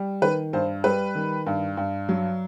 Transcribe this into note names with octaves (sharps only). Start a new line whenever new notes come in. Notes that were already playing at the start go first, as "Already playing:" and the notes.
Already playing: G3
D#3 B4
G2 C5
G3 B4
D#3
G2
G2
F#3